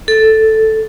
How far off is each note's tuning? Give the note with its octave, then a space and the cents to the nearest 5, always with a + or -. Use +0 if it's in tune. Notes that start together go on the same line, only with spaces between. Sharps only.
A4 +0